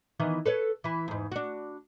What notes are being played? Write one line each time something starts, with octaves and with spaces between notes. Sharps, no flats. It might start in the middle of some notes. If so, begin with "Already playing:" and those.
D#3 E3 B3
A4 B4 C#5
E3 E4
E2 G#2
D4 F#4